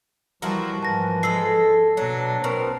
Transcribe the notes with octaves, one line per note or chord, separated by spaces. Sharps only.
E3 F3 G3 E4 F#4 A#4
G#2 E3 F3 A5 A#6
G#3 A4 E6 C7
B2 F#3 D4
B2 C4 A#4